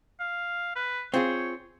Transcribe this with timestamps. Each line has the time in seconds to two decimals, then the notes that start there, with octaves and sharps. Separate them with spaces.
0.20 F5
0.76 B4
1.14 C4 F4 G#4 C#5